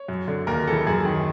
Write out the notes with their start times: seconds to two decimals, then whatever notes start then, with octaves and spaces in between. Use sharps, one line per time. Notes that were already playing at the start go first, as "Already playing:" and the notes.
Already playing: C#5
0.08 F#2
0.28 D3
0.47 D#2 A#4
0.67 C#3 E3 A4
0.87 F#2 G#4
1.05 D#3